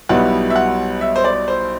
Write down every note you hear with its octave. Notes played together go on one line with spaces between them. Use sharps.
B1 B2 G3 B3 E4 F#5
E5
F#5
E5
C5
D5
C5